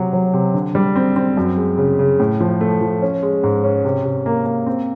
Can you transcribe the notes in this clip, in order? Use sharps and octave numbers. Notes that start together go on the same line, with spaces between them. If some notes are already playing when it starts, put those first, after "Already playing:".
Already playing: C3 F#3
F#3
C3
D3
G3
C4
C4
F#2
G#3
C#3
C#3
A2
F3
A3
F3
C#4
G#3
G#2
C#4
C3
C3
A#3
A#3
C4